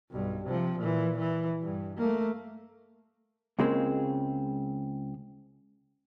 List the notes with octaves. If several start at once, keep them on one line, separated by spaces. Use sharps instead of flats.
B1 G2
C3 F3
A#2 E3
E3
G2
A3 A#3
C#2 C#3 G#3 A#3 C4